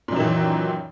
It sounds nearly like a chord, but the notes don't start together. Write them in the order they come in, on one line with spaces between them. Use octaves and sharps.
A#2 F#2 D#3 E3